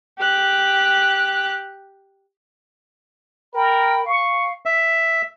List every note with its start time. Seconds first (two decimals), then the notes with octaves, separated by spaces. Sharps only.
0.18 G4 F#6
3.54 A#4 G5 B5
4.06 F5 C#6
4.66 E5